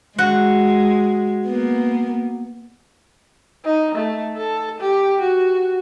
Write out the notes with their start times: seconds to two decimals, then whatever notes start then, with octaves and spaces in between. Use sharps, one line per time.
0.18 G#3 F#4
1.46 A#3 B3
3.65 D#4
3.95 A3
4.37 A4
4.80 G4
5.21 F#4